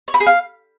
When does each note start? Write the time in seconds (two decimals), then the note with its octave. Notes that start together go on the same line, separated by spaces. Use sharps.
0.08 C#5
0.14 B5
0.20 G#4
0.27 F5